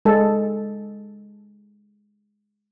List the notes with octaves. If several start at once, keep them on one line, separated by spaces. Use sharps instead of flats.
G#3 A4